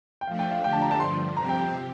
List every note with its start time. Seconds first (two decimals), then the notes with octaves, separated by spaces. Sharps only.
0.21 G5
0.27 F3 A3 D4 F5
0.39 G5
0.51 F5
0.63 D3 F3 A3 D4 G4 G5
0.73 A5
0.82 A#5
0.91 A5
1.00 G2 D3 F3 C6
1.37 C3 F3 C4 G4 A#5
1.49 G5
1.61 G5